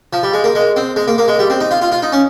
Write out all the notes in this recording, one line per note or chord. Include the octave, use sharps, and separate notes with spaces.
F3
G3
G#3
A#3
G#3
C4
G#3
A#3
A#3
G#3
G3
C4
D#4
F4
F4
F4
D#4
C#4